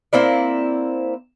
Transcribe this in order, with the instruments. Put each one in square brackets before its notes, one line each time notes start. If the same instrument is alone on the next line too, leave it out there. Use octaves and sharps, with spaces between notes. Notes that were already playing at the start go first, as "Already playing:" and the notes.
[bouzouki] A#3 C4 E4 D5